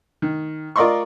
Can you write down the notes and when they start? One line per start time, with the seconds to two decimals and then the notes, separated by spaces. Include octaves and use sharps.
0.22 D#3
0.76 F4 A#4 D5 D#5 C6 C#6